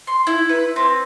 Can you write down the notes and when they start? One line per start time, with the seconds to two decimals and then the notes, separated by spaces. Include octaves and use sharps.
0.07 C6
0.27 E4
0.49 B4
0.76 C4